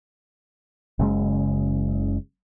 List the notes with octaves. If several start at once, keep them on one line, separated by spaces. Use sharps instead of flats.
F#1 C#3 G#3